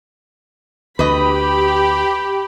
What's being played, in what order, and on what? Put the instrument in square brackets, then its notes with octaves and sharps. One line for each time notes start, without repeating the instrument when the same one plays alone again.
[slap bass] D2 [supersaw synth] G4 [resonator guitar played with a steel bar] B4 D#5 [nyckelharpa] B5